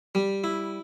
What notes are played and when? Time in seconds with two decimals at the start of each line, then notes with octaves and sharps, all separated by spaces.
0.15 G3
0.44 E4